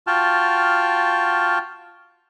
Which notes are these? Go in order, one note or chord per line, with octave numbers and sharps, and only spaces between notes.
F4 F#4 G5 A5 F6